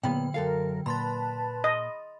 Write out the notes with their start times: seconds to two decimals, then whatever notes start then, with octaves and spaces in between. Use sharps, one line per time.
0.03 A#2 D3 F#3 B3 G5
0.34 F#2 A4 A#4 F5
0.86 A#2 B4 A5 B5 C6 A6
1.64 D#5